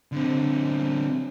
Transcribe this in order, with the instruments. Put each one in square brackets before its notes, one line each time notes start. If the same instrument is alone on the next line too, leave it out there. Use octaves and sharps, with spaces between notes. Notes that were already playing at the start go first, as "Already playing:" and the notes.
[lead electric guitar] D3 C4